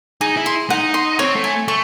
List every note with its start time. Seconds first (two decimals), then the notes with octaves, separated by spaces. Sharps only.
0.21 D#4 G#4
0.37 E4
0.46 C6
0.70 D#4 F#5
0.94 C6
1.18 C4 C#5
1.36 A3
1.44 G#5
1.68 A3 C#6